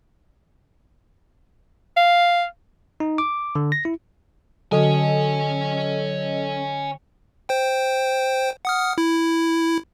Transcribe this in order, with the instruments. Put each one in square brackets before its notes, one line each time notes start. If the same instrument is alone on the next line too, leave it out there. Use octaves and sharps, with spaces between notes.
[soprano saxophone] F5
[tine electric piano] D#4
D6
D3
A#6
E4
[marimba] D3 F#4 [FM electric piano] F#3 A4 D#5 [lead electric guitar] C#5 G#5
[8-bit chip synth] C5 G5
F#5 D#6 F6
E4